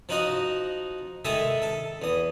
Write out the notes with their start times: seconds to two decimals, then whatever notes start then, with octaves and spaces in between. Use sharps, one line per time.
0.09 F3 D#4 F#4 D#5
1.25 D#3 G#3 A4 E5 D#6
1.62 A4
2.02 E2 D#6